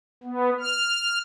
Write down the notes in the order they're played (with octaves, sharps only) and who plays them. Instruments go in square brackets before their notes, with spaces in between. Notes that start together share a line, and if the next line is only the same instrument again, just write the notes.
[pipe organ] B3
F6